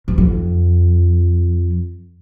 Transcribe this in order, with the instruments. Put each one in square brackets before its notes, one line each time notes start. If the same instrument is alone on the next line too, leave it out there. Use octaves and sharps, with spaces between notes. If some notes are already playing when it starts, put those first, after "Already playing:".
[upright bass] E2
F2